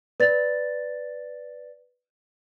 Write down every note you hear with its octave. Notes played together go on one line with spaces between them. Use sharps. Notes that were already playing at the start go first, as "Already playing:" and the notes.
B4 D5 A6